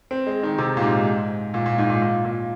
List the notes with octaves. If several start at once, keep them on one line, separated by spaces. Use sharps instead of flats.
C4
G#3
D#3
C3
A#2
G#2
A#2
A#2
G#2
A#2
A#2
A#2